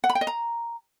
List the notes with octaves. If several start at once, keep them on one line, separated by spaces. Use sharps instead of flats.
F#5
B5
G5
D#5
A#5